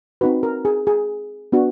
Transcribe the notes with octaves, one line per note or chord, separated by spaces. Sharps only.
C4 D#4 F#4 B4
A#4
G#4
G#4
B3 D4 F#4